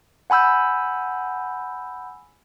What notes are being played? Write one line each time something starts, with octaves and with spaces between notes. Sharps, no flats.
F#5 G#5 B5 E6 G6